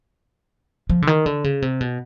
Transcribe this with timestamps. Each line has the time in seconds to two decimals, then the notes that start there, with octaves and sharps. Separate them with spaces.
0.90 F3
1.02 D3
1.07 D#3
1.26 D3
1.44 C#3
1.62 C3
1.81 B2